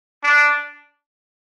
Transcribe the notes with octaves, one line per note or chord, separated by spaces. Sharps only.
D4